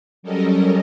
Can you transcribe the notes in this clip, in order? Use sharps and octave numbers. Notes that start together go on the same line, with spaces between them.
F#3 G3 C#4 A4 A#4 D#5